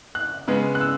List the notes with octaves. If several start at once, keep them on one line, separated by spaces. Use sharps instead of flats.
F#6
C#3 G#3 B3
F#6
E6